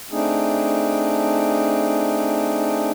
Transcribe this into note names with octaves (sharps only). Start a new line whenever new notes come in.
A3 C4 D4 D#4 G#4